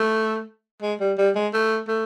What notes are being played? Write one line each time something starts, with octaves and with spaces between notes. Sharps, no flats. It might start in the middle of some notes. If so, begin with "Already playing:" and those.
Already playing: A3
G#3
G3
G3
G#3
A3
A3